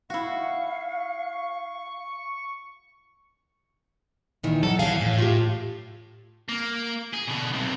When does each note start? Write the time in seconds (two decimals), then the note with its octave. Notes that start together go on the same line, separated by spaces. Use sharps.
0.10 E4 F#4 F5 C#6
4.43 A#2 D#3 E3
4.63 F#3 A4 F#5
4.79 E3 G#4 F5
5.01 A2
5.18 F4 G4
6.49 A#3
7.13 G#4
7.27 B2 D3
7.53 B1 C3